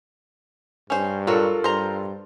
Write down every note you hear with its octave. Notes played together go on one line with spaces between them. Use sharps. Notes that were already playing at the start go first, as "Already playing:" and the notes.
G2 C#4 C5
F#3 F4 F#4 A4 A#4
G2 C5 A#5